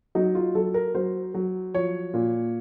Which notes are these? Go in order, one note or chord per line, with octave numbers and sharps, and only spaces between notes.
F#3 D#4
F4
F#3 A4
A#4
F#3 C5
F#3
F3 C#5
A#2